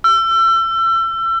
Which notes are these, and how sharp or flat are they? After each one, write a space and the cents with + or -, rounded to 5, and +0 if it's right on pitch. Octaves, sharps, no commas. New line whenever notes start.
E6 +35